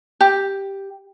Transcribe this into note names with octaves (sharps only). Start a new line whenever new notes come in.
G4